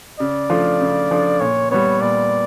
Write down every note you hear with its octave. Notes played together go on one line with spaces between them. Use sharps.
C#3 D5
F3 A3 D4 F4
C#3
F3 A3 D4 F4
A#2 C#5
G3 B3 C#5
A#2 D5